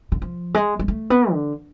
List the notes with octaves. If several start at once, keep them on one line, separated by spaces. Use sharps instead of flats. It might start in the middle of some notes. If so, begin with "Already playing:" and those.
D3
F3
G#3
G#3
A3
B3
D3